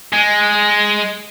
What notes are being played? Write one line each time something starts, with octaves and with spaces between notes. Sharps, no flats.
G#3